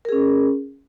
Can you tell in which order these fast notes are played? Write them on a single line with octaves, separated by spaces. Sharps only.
A#4 G#4 C#4